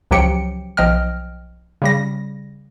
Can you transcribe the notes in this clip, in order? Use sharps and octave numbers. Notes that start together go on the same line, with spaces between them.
C#2 F3 F#3 G4 G5 C#7
B1 F3 D#5 G5 F6
C#3 G3 A#6